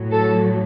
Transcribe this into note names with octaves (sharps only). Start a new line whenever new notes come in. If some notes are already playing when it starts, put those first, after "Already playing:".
Already playing: A2 F#3
A4